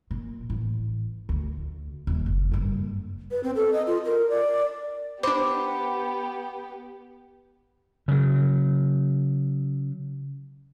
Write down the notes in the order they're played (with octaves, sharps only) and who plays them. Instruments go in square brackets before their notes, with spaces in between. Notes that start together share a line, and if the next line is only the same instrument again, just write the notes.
[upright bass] A#2
A1
D2
D#1
F#1
F#1 G2
[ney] B4
C4
A4
D#5
F4
A#4
D5
[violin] B3 G4 [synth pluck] D4 C5 [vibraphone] B5 [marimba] D6
[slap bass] C#3 F#3